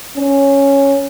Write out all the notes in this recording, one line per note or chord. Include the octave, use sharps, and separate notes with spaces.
C#4